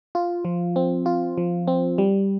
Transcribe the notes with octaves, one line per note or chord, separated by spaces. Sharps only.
F4
F3
C4
F4
F3
C4
G3